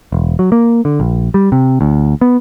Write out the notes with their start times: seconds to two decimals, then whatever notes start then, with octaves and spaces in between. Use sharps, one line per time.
0.12 E1
0.39 F#3
0.52 A#3
0.85 D3
1.00 A#1
1.34 G3
1.52 C3
1.81 D2
2.21 B3